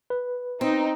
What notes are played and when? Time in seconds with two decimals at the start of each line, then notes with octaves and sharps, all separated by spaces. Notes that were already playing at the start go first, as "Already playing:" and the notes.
0.10 B4
0.61 C4 D#4